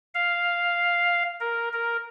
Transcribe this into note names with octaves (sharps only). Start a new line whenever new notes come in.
F5
A#4
A#4